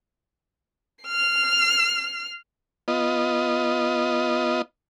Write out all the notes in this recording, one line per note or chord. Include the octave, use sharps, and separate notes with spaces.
F6 C7
B3 F4 D#5